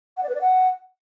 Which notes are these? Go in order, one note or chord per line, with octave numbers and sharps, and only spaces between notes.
F#5
D5
B4
D5
F#5